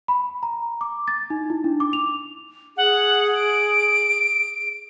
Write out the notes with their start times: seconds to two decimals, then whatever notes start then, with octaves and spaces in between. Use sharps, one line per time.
0.08 B5
0.43 A#5
0.81 D6
1.08 A6
1.30 D#4
1.50 E4
1.64 D4
1.80 D6
1.93 F7
2.77 G#4 F#5
3.35 D7